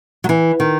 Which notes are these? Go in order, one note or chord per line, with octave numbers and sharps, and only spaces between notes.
F#3
E3
D#3